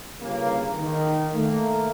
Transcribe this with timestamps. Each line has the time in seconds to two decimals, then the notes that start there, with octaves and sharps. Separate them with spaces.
0.21 G1 C#3 A#3
0.75 D#3
1.34 A3 A#3